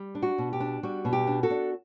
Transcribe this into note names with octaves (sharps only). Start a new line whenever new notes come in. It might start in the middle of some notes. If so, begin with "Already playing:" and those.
Already playing: G3
D4
F#4
B2
G4
D4
G3 F#4
B2
G4
D4
F#4 A4
D4